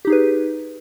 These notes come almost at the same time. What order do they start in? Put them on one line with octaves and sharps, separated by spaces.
G4 D#4 G#4 B4